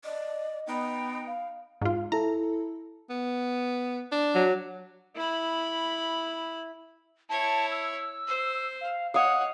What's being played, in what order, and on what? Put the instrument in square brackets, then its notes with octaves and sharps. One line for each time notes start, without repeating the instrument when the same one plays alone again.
[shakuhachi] D5 [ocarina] D#5
[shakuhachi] B3 [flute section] D#4 G5
[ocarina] F5
[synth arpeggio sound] G#2 F4
[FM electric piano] E4 A4 [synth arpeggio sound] A#5
[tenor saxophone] B3
D4
[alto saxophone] F#3
[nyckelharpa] E4 B5
[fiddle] E4 C#5 [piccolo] A5
[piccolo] E6
[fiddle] C5
[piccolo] F5
[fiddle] C#5 [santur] D#5 F5 [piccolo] F#5